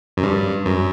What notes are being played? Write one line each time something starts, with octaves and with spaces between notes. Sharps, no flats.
F#2
G2
F#2